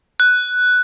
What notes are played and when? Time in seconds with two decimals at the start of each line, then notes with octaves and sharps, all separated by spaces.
0.20 F#6